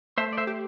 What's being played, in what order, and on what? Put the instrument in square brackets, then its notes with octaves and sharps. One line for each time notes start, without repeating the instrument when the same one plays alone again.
[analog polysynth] A3 [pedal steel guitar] C5 E5
[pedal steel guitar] D5
C5 E5
[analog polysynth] G4